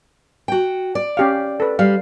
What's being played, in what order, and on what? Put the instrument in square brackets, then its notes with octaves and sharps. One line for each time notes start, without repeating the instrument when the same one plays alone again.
[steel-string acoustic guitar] F#4 G5
D5
[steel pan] C#4 G4 F5
A4 B4
[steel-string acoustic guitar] G3 [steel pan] F5